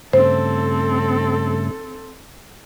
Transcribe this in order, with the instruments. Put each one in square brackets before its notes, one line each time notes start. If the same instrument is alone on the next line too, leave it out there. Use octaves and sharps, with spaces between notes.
[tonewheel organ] G2 C#3 A3 [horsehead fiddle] C4 A4 [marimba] C5